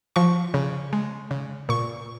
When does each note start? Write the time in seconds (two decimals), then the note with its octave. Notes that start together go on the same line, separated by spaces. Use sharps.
0.16 F3 C#6
0.54 C#3
0.93 G#3
1.31 C#3
1.69 A#2 C#6